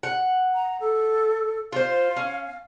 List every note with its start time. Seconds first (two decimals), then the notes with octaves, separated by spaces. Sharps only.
0.03 F#5
0.54 A#5
0.80 A4
1.72 F4 C5 F5
2.16 C#4